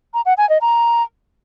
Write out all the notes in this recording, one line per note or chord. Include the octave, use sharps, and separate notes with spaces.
A#5
F#5
G#5
D#5
A#5